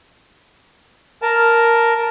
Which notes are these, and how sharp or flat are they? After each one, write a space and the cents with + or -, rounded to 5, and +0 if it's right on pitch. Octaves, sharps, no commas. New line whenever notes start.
A#4 +0 A5 +0